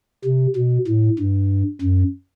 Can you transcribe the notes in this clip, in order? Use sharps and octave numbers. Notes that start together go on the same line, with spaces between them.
C3
B2
A2
G2
F#2